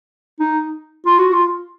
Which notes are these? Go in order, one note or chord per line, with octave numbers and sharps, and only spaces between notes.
D#4
F4
F#4
F4